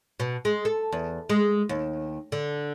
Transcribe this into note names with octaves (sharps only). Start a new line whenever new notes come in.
B2
G#3
A4
E2
G#3
D#2
D3